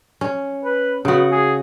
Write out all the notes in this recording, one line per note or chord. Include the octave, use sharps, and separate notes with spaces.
C#4
B4
C#3 B3 F#4
G#4